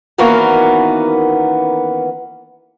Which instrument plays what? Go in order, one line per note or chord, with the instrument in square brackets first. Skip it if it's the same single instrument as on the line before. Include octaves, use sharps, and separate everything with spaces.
[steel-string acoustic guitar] D#3 E3 A#3 B3 C#4 F#4